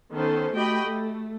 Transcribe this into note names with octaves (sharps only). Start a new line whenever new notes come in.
D#3 B3 C#4 A4 C5
A3 F#4 G4 D#5 G5 B5
A3